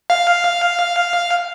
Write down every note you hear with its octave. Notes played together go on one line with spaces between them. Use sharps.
F5